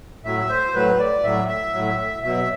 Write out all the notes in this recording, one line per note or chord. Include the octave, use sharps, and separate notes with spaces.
A2 F#3 E5
C5
A2 F#3 B4
D5
A2 F#3 E5
E5
A2 F#3
B2 F#3 E5